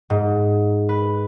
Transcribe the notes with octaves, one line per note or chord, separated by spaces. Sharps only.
G#2
B4